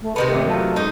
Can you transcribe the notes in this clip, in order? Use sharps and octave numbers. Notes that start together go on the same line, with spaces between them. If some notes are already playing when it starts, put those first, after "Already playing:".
A3
C3 D#3 B3 B4
G#1 A3 G4
F#3 A3 F4 A4
G#2 D#4 D#5